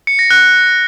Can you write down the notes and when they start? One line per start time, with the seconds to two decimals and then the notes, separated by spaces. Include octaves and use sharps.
0.07 C#7
0.19 A#6
0.31 F#6